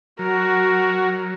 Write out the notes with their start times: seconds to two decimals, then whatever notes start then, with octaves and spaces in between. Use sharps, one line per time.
0.19 F#3 F#4 A#4